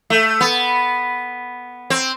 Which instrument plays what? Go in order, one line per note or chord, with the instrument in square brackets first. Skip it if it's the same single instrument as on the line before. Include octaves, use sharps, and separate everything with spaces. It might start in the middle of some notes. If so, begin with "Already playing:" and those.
[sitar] A3
B3
C4